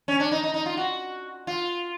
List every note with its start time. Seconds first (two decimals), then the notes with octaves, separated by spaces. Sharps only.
0.08 C#4
0.20 D4
0.31 D#4
0.43 D#4
0.54 D#4
0.66 F4
0.77 F#4
1.47 F4